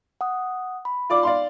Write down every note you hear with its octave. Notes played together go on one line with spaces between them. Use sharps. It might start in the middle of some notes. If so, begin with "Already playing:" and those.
F#5 D#6
B5
F4 D5 D6
D5 F5 C6